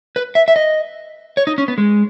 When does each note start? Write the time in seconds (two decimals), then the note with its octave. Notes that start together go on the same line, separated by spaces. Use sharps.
0.16 B4
0.35 E5
0.48 E5
0.56 D#5
1.37 C#5
1.47 D#4
1.58 C#4
1.68 B3
1.78 G#3